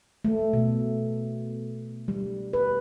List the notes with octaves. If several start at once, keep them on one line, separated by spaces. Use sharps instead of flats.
A3
B2
G3
B4